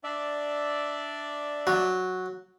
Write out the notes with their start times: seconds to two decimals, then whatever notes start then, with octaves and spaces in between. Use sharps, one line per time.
0.04 D4 D5 E5
1.67 F#3